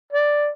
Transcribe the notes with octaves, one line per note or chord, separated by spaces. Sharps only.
D5